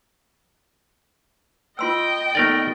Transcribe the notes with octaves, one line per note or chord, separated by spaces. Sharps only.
F4 D#5 G5 C6 E6
D#3 A3 B3 A#4 D5